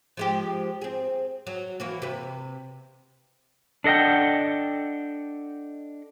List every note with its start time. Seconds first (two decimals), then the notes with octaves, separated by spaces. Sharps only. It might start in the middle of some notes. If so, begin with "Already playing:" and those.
0.17 F3 G#3 G4
0.81 C4 G#4
1.47 F#3
1.80 E3 A#3 F#4
2.02 C3 B4
3.84 D4 A4 D#5 F#5 G5